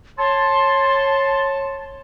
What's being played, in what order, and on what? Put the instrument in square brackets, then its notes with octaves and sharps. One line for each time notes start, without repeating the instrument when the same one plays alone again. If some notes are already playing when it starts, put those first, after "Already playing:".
[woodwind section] C#5 A5 [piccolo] C6